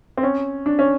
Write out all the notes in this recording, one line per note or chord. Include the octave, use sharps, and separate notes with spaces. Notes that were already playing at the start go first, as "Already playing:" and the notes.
C4
C#4
D4
C#4